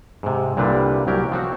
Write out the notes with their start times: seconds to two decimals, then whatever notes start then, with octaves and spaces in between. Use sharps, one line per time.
0.23 G#2 C3
0.57 C2 A#2 D3 G3 D4 B4
1.07 C2 F#3 G4 A#4
1.32 F3 C4 F#4